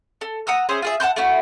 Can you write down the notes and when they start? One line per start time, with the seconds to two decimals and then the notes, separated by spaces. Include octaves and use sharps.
0.21 A4
0.47 F#5 A#5 D#6 E6
0.69 C#4 G#4 C5 E5
0.82 F4 G#4 E5
1.00 F#5 A5 C6 G6
1.16 A3 B3 E4 F#4